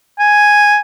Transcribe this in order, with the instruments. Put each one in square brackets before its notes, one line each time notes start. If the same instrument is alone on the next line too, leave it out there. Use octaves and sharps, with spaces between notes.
[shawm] G#5